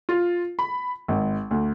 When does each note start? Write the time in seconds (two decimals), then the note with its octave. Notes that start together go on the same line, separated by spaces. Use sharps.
0.09 F4
0.59 B5
1.08 G#1
1.51 D2